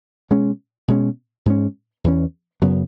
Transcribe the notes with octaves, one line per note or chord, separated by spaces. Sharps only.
B2 G#3 C#4
B2 G#3 C#4
G#2 G#3 C#4
E2 E3 C#4
F#2 C#3 F#3 B3